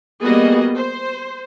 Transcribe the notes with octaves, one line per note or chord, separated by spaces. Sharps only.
G3 A#3 B3 F#4 G#4 D#5
C5